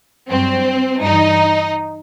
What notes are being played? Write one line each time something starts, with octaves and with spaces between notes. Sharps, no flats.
G2 F#3 C4
G2 E3 D#4